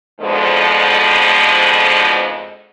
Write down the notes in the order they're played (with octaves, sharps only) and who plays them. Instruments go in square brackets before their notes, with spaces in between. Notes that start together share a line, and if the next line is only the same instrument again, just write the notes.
[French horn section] F2 G#2 B2 D3 F3 G#3